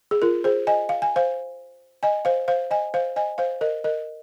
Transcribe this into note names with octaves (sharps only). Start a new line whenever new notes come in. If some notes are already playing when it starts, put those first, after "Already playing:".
G#4
F4 A#4
G#4 C5
D#5 G#5
F5
G#5
C5 F5
D#5 G#5
C5 F5
C5 F5
D#5 G#5
C5 F5
D#5 G#5
C5 F5
A#4 D#5
A#4 D#5